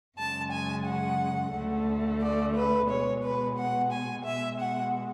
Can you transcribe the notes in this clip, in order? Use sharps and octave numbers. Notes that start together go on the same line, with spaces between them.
F#2 C#3 G#3 A5
G#5
F#5
D2 D3 A3
D5
B4
B2 G#3 C#5
B4
F#5
G#5
B2 G#3 E5
F#5